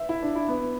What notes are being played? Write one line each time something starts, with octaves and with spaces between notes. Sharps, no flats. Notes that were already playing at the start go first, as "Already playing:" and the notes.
Already playing: E5
E4
D4
E4
B3